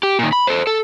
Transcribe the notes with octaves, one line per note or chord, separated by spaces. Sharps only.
G4
A#2 D#3
B5
A4 C5
A4